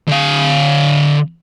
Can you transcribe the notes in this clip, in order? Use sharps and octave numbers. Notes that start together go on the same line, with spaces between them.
D3 F5